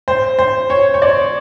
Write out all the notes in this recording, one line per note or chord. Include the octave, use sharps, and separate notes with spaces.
C5
C5
C#5
C#5
D5